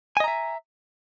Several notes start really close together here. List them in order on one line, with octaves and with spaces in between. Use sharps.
G#5 D#5 A#5 E5